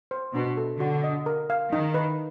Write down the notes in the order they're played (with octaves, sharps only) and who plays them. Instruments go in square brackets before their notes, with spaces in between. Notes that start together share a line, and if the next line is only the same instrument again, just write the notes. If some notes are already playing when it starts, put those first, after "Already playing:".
[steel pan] C5
[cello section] B2 [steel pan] D4
[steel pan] A4
[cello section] D3 [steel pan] F#4
[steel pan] D#5
A#4
F5
[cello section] D#3 [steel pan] D#4
[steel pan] B4